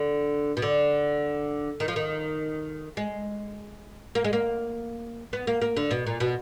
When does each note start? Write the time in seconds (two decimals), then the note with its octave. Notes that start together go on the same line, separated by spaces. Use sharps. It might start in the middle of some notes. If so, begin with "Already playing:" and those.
Already playing: D3
0.57 B2
0.62 D3
1.80 D#3
1.88 F3
1.96 D#3
2.97 G#3
4.15 A#3
4.24 G#3
4.33 A#3
5.33 B3
5.47 A#3
5.62 A#3
5.77 D3
5.91 B2
6.07 A#2
6.20 B2